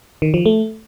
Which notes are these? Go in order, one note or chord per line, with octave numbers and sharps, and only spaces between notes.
D#3
F3
A3